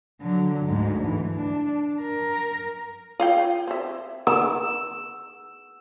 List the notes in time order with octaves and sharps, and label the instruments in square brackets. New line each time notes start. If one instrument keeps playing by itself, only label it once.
[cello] D3 F#3
D2 G#2
E3
D4
A#4
[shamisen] F4 F5 G5
C4 E5
[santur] E6